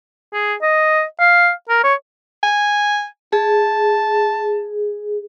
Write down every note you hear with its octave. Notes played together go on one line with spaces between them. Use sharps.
G#4
D#5
F5
A#4
C#5
G#5
G#4 A5